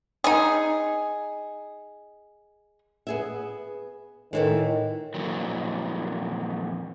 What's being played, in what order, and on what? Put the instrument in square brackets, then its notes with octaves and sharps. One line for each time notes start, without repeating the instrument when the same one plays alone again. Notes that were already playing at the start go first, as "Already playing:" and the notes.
[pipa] D#4 G#4
[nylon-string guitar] B3 G#4 E5
[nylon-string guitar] A2 E3 A3 [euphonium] D#3
[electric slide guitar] F2 A#2 E3 F#3